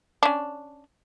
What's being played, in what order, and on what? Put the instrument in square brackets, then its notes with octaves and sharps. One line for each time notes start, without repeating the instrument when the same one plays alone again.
[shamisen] C#4 D4